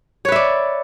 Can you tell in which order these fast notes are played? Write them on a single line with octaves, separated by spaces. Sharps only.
C#5 B4 E5 D5